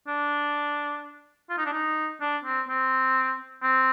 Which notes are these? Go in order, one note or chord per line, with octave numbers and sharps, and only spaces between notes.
D4
F4
D#4
D4
D#4
D4
C4
C4
C4